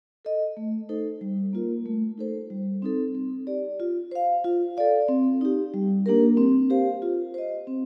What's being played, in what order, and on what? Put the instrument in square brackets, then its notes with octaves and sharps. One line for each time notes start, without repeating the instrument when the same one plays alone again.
[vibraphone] A4 D#5
A3
D#4 A4 C5
G3
A#3 F4 A#4
A3
D#4 A4 C5
G3
C4 D#4 A4
C4
G4 D5
F4
C5 F5
F4
A4 D5 F5
C4
D#4 G4
G3
A#3 D4 G4 A#4
C4
G4 C5 F5
F4
C5 D#5
C4